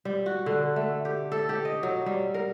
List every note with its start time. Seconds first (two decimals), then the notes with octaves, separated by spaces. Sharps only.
0.05 G3
0.26 F#4
0.46 D3
0.76 A3
1.05 G4
1.32 A4
1.49 G4
1.65 D#5
1.83 F#3
2.06 G3
2.34 A#4